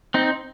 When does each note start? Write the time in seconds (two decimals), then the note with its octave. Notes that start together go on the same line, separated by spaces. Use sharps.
0.14 C4 D#4